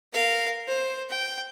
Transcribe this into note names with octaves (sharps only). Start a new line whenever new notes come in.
A#4 F5
C5
G5